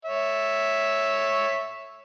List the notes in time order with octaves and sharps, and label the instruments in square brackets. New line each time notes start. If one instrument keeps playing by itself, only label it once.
[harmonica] C#5 E5